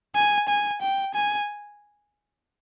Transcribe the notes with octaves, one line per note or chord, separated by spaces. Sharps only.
G#5
G#5
G5
G#5